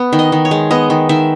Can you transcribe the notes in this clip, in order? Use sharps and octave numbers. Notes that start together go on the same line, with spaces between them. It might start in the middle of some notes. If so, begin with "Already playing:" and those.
Already playing: B3
D#3
D#5
D#3
C#5
G#3
B3 D#5
D#3
D#3 E5